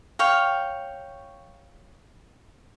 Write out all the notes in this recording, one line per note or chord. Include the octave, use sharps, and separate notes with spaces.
C#5 F5 G5